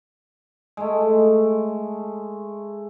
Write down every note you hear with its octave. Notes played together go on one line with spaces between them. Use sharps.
G#3 A3